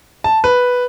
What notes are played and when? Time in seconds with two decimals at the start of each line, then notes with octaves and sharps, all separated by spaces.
0.24 A5
0.44 B4